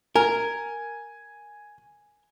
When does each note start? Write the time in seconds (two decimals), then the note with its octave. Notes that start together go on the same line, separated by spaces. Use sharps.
0.16 A#4 G#5